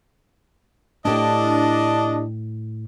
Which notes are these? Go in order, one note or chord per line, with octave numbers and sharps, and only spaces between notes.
A2 D4 E4 G4 A4 D#5